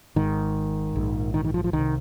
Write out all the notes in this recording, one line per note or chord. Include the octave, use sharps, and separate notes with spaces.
G#1 G#2 D#3
A#1 G#2
D#3
D#3
F3
F3
C2 D#3
C3